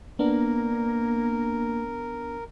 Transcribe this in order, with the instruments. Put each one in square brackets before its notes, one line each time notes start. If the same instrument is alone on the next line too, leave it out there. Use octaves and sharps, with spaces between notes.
[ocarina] A#3 [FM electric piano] B3 D4 [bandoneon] A#4